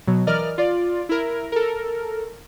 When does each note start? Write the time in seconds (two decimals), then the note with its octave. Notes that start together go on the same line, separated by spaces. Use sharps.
0.07 B2 F#3
0.27 E3 A#4 D5 D#5 F6
0.58 F4 D5
1.09 E4 A#4
1.52 A4 A#4